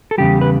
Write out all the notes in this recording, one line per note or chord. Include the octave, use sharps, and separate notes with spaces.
A4
E2 C#3 G3 G4
B4